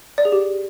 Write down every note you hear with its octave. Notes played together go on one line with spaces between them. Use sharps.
D5
G#4
G4